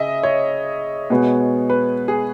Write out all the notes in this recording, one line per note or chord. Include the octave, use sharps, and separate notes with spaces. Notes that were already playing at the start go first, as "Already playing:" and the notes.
Already playing: C#3 D#5 E5
C#5
B2 G#3 B3
B4
G#4